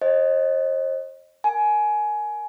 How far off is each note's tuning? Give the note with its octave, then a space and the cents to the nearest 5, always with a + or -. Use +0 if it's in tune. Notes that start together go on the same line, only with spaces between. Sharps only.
C5 +45 D#5 +0
A#4 +5 G#5 +20